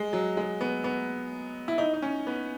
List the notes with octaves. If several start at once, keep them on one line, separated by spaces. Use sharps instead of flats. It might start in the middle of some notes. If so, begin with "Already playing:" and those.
Already playing: G#3
F#3
G#3
B3
B3
E4
D#4
D#4
C#4
B3